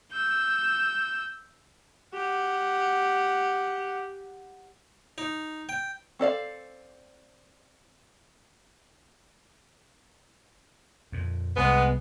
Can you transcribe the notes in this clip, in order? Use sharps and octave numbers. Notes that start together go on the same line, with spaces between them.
E6 G6
G4 F#5
D#4
G5
C4 A4 D5 F5
F2 A#2
C2 G#3 B3